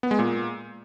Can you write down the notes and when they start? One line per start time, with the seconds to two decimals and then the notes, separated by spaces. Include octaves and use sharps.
0.03 B3
0.11 G#3
0.19 A#2